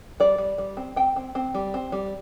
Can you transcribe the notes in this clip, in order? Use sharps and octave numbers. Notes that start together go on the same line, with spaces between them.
G3 D5
G3
G3
C4
C4 G5
C4
C4
G3
C4
G3